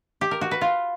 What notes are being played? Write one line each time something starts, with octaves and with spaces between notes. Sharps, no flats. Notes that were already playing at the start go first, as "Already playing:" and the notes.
G4
A#4
F#4
B4
F4